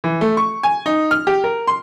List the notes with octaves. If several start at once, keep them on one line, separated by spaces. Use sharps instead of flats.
E3
A3
C#6
G#5
D#4
F6
G4
A#4
C6